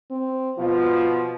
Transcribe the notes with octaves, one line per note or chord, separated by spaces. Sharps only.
C4
B2 F3 F4